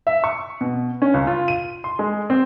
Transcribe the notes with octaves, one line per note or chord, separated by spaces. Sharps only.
E5
C#6
B2
C#4
C#2
F4
D#7
C6
G#3
C4